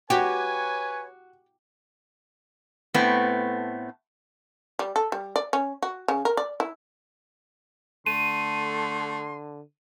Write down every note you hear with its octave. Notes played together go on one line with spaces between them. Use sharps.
F#4 G4 B4 C#5 G#5
A2 A3 B3 C4
G3
A4
G3
D5
C#4
F#4
C#3
A#4
D5
E4
D3 A3 C6 D#7